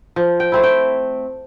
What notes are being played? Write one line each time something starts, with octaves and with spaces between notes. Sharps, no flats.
F3
G5
A3 C4 E4
G5